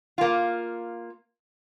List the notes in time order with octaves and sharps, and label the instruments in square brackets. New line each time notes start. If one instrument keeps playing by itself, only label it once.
[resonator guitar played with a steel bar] A#3 F4